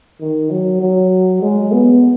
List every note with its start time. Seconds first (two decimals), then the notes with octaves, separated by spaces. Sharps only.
0.21 D#3
0.51 F#3
0.81 F#3
1.42 G#3
1.73 B3